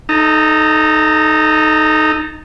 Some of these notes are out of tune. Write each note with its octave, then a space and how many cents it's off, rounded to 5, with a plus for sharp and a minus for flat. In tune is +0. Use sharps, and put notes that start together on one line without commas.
D#4 +0 A4 -15 A#5 -40